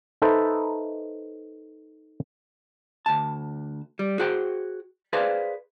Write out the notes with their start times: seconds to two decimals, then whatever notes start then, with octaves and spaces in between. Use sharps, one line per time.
0.22 D#4 A4 B4 C5 E5
3.06 D2 A5
3.99 G3
4.19 F#4 G#4 C5 G5
5.13 G#4 B4 C5 D5 F5